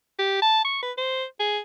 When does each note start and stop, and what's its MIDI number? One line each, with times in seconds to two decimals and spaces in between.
0.19 0.39 67
0.42 0.64 81
0.64 0.78 85
0.82 0.92 71
0.98 1.24 72
1.40 1.59 68